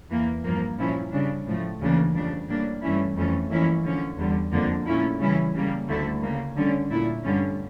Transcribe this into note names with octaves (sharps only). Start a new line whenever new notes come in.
E2 E3 A#3
G2 F3 A#3
A#2 F3 C#4 E4
C#3 G3 D4
A2 F3 A3
D2 C#3 E3 A#3 D4
F2 C#3 G3 D4
A2 G3 A#3 D4
G2 E3 A3 C#4 E4
F2 E3 A3 C#4
F2 E3 A#3 C#4 E4
D3 F3 C#4
E2 D3 G3
F2 D3 F3 A#3 D4
A#2 A3 C#4 E4
C#3 E3 G3 C#4 E4
C#3 G3 A#3
D2 D3 A3 E4
C#3 G3 A#3
D3 G3 C#4
A#2 A3 E4
G2 D3 G3 C#4